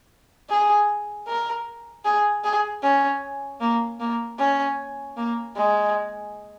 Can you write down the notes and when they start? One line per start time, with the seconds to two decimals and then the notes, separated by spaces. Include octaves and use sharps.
0.49 G#4
1.27 A#4
2.04 G#4
2.44 G#4
2.83 C#4
3.60 A#3
4.00 A#3
4.38 C#4
5.17 A#3
5.55 G#3